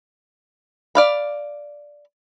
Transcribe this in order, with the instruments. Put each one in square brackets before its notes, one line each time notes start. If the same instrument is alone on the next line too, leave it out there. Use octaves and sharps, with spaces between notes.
[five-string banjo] D5 F5 B5